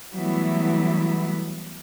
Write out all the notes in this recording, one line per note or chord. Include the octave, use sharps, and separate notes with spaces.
E3 F#3 G3 A3 B3 E4